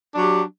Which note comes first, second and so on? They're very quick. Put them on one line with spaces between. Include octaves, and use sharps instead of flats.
D4 F#3 G4